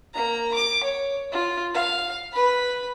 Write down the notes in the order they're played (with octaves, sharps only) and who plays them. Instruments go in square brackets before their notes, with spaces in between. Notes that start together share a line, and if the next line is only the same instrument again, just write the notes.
[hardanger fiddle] A#3 A#5
D6
C#5
F4
F5
B4 B5